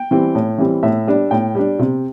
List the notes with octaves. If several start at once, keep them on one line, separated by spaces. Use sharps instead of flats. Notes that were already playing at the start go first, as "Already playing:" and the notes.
Already playing: G5
E3 G3 C4
A2
E3 G3 C4
A2 E5
G3 D4
A2 G5
G3 D4
C3